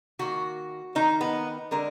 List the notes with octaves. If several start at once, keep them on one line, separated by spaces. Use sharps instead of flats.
D#3 A#3 F#4
D#3 A#3 D#4
B3
D3 G#3 A#4